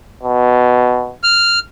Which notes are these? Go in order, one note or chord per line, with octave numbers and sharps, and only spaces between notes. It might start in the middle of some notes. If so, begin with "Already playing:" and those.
B2
F6